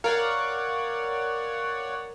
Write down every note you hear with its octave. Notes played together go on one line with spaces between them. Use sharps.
A#4 C#5 D5 F5 F#5